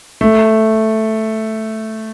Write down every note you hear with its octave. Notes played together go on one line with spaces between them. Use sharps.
A3